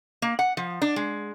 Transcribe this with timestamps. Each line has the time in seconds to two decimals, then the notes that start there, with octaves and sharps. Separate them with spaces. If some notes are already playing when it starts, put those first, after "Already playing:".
0.22 A#3
0.39 F#5
0.57 F3
0.82 D4
0.96 G#3